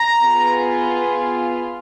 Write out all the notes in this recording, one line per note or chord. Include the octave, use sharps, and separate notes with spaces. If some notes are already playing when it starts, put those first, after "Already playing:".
Already playing: A#5
B3 F4 G#4